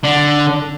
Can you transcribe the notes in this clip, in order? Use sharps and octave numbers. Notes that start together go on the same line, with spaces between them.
D3